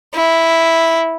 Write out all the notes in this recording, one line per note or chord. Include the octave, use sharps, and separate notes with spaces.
E4